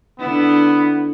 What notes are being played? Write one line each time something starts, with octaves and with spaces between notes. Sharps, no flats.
D3 B3 E4